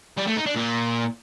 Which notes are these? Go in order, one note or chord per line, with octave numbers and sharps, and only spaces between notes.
G3
A3
D#4
D4
A#2